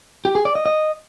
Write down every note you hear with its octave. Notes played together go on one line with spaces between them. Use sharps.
G4
G#4
D5
D#5
D#5